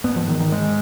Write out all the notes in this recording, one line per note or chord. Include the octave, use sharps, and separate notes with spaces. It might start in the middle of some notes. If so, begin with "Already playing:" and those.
G#2 B3
F3
D#3
D#3
G#3